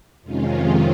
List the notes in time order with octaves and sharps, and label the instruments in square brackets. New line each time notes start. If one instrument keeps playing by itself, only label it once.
[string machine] F2 C3 D#3 G#3 C#4 F4